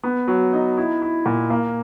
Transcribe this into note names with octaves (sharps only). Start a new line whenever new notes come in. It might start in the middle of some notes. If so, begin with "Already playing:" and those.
B3
F#3
D#4
E4
E4
A#2
A#3